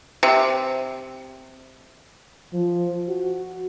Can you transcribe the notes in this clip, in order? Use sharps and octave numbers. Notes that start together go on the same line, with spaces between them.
C3
F3
F#4